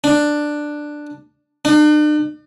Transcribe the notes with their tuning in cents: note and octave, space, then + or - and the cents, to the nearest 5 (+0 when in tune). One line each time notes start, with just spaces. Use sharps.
D4 +10
D4 +45